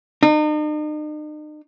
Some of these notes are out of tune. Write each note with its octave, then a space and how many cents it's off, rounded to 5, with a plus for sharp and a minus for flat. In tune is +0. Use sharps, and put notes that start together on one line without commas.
D#4 -45